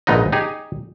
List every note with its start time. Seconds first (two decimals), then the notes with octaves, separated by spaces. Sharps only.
0.07 A#1 G#2 B3 D#4 D#5
0.32 D#4 G4 G#4